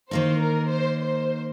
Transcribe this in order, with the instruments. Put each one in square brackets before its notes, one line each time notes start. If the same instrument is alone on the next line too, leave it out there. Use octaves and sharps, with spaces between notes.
[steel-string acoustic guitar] D#3 A#3 D#4 [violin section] C5
[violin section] A#4
C5
C5